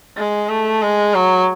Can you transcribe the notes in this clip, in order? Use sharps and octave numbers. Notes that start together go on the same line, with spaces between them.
G#3
A3
G#3
F#3